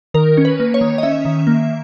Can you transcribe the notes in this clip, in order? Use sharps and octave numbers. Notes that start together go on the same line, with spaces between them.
D#3 A#4
C#4
B4
A#3
C#5
D#3
D#5
C#4 E5
D#3
A#3